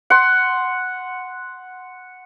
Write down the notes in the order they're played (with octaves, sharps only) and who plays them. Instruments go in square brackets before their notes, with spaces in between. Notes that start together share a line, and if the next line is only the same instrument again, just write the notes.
[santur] F#5 C6